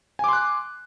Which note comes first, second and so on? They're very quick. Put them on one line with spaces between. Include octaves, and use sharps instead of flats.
G#5 D6 C6 F#6